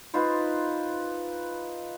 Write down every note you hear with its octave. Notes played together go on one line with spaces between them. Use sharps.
D#4 F4 B4 C5